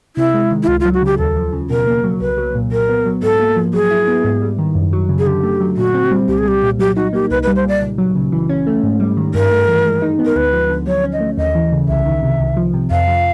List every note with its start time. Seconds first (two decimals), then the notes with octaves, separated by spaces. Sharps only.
0.16 C3 E4
0.34 G#3
0.51 D#3
0.63 E4
0.67 C#2 F4
0.80 F4
0.85 F#3
0.94 F#4
1.02 C#3 G4
1.18 D#2 A4
1.36 F3
1.53 C#3
1.70 B2 A#4
1.87 A#3
2.04 F#3
2.20 C2 B4
2.38 F#3
2.55 A#2
2.72 A#2 A#4
2.89 B3
3.06 F#3
3.23 G#2 A4
3.39 A#3
3.56 F3
3.73 F#3 G#4
3.91 E4
4.08 B3
4.24 G#2
4.42 G3
4.58 D#3
4.75 F#2
4.93 F#3
5.09 C#3
5.19 G#4
5.27 D3 G4
5.43 A3
5.60 F#3
5.77 A#2 F#4
5.94 C4
6.11 G3
6.28 C2 G4
6.38 G#4
6.45 G3 G4
6.63 A#2
6.79 F#3 G4
6.96 D#4 F#4
7.13 A#3 G4
7.31 C2 B4
7.43 B4
7.47 G3
7.56 C5
7.64 A#2 D5
7.81 C#2
7.98 F#3
8.16 C#3
8.32 E3
8.49 C#4
8.67 A3
8.83 G#2
9.00 G3
9.17 D#3
9.34 G2 A#4
9.51 A3
9.68 E3
9.85 G#3
10.02 D#4
10.19 B3
10.26 A#4
10.36 D2 B4
10.53 F3
10.70 D3
10.87 F#3 C#5
11.04 C#4
11.13 D#5
11.21 A3
11.37 D#2 D#5
11.55 E3
11.72 C#3
11.88 C2 E5
12.06 D#3
12.23 C3
12.40 C2
12.57 F3
12.73 C3
12.91 F2 F5
13.08 F3